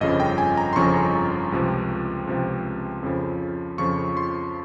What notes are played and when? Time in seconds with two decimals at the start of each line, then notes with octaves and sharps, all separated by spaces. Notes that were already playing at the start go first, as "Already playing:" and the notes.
0.01 G1 F2 C#3 F3 D#5
0.20 G5
0.38 G#5
0.57 A#5
0.73 C6
0.76 G1 F2 C#3 F3 C#6
1.52 C#2 C3 F3
2.27 C#2 C3 F3
3.03 F2 C#3 F3
3.78 F2 C#3 F3 C#6
4.17 C6